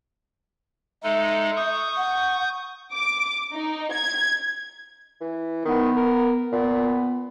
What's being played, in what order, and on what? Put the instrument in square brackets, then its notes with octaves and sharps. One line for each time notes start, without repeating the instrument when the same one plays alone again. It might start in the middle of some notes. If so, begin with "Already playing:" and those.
[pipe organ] G#3 D#4 A4 [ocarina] E5
[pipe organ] C#6 D#6 G6
[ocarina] F#5
[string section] D6
D#4
G#6
[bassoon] E3
[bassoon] D#3 [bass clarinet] B3
[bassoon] A#4
[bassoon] A#2 [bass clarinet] B3